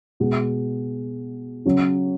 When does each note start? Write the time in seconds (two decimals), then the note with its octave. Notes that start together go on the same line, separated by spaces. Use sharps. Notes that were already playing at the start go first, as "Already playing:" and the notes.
0.20 B2 G#3 B3
1.65 C#3 F#3 C#4